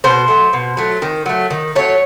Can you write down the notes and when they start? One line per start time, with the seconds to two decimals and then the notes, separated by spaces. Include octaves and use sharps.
0.04 B2 C5
0.28 F#3 A3
0.53 B2
0.77 F#3 A3
1.02 D#3
1.26 F#3 A3
1.51 D#3
1.75 F#3 A3 C#5